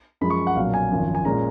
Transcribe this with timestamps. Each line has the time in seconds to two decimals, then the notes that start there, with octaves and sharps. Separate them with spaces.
0.21 F#2 F3 G#3 B5
0.30 C#6
0.47 F#5
0.56 B1 A#2 F#3 C#4 F5
0.74 G#5
0.91 G#1 F#2 F3
1.15 G#5
1.25 A#2 G#3 C#4 A#5